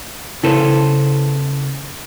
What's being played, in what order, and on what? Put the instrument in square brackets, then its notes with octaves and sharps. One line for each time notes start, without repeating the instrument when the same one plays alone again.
[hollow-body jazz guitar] C#3 E4 A4 B4 C5